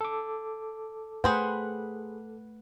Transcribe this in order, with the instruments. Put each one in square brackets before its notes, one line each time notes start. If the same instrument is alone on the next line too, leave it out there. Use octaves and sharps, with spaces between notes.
[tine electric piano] A4 D6
[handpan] A3 B4 F#5 [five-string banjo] G#4 C5 G5